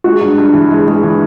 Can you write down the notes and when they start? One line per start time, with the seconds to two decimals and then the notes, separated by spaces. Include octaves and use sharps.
0.04 G#3 F#4
0.21 G2
0.38 G2
0.54 E3
0.71 G#3
0.87 G#3
1.03 E3